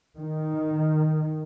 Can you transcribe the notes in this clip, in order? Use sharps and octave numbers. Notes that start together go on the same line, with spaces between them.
D#3